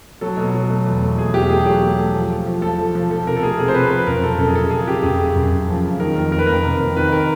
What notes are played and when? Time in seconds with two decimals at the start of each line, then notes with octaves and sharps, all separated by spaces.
0.21 F#3 A4
0.37 B2
0.54 F#3
0.69 A3
0.86 E2
1.01 A3
1.17 B2 G#4
1.34 E2 G4
1.49 A3 G#4
1.66 F#3 G4
1.82 A3
1.98 A3
2.15 F3
2.30 A3
2.46 F3
2.62 F3 A4
2.78 F3
2.95 F3
3.10 F3 A4
3.26 C3 A#4
3.37 A4
3.43 A3 G#4
3.58 C3 G#4
3.68 C5
3.74 C3 B4
3.90 F3 B4
4.07 F#2 A#4
4.23 F#2 A4
4.38 F#2 A4
4.48 G#4
4.55 F#2 A4
4.71 C#3 G#4
4.88 C#3 G4
5.03 F#2 G#4
5.20 C#3
5.36 F#2
5.51 F#2
5.68 F3
5.83 C#3
6.00 D#3 A#4
6.15 F2 A#4
6.31 F2 A#4
6.39 B4
6.47 F2 A#4
6.63 C3
6.80 F2
6.97 D#3 B4
7.12 A#4